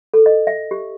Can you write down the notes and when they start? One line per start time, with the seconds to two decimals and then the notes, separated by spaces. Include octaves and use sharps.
0.14 A4
0.26 D#5
0.47 E5
0.71 G4